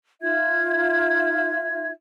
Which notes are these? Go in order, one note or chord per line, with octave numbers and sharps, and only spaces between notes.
D#4 F4 E5 G#6